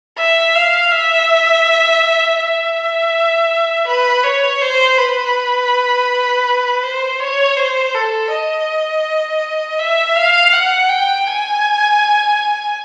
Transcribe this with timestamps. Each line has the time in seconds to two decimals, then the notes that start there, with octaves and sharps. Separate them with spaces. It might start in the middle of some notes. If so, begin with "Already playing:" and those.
0.18 E5
0.55 F5
0.91 E5
2.40 E5
3.87 B4
4.24 C#5
4.62 C5
4.98 B4
6.83 C5
7.20 C#5
7.57 C5
7.95 A4
8.31 D#5
9.79 E5
10.16 F5
10.52 F#5
10.89 G5
11.27 G#5